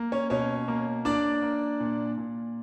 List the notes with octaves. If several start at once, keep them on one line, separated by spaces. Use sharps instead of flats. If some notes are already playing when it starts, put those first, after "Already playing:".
Already playing: A#3
C#4 C#5
B2 C#4 C#5
A#3
A#3 D4 D5
A#3
A#2
A#2